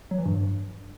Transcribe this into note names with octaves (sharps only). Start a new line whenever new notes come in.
F#3
E3
G2